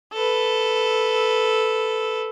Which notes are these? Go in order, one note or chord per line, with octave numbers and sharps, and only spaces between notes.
A4 B4